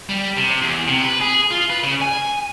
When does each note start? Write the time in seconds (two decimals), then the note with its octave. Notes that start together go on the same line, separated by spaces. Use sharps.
0.09 G3
0.37 C3
0.61 E2
0.88 C3
1.04 B4
1.20 G#4
1.51 F4
1.70 B4
1.83 C#3
2.01 G#5